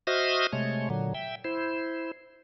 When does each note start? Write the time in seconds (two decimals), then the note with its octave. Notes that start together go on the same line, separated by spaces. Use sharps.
0.07 F#4 C5 D#5 E5 D#6 F6
0.53 C3 G#3 A3 C#5
0.90 A#2 D3 F#3
1.14 E5 G5
1.44 E4 C5